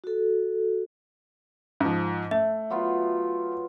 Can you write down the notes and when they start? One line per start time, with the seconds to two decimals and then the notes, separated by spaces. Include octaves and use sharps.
0.04 F#4 A4
1.80 G#2 F3
2.31 A3 E5
2.70 F#3 B3 F4